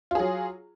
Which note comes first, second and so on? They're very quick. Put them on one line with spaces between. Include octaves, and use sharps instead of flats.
F4 G#4 F#3